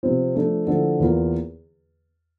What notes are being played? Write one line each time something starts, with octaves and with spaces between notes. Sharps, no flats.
C3 F3 C4 F4
F3 A3 D4
D3 F3 A#3 E4 A4
E2 E3 A#3 F4 A#4